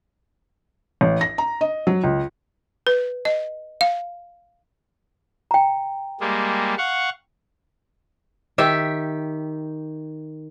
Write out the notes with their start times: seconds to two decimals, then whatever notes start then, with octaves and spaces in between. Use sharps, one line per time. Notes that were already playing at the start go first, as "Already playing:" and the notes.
1.01 A1
1.21 A#6
1.38 A#5
1.61 D#5
1.87 F#3
2.04 C#2
2.87 B4
3.25 D#5
3.81 F5
5.51 G5 A#5
6.21 G3 G#3 A#3
6.78 F5 F#5 C#6
8.58 D#3 G4 E5 G5